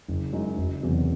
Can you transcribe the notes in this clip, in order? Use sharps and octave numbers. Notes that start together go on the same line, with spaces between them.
F#1
F#2 C#3 G#3 D#4
F#1
E2 C3 F#3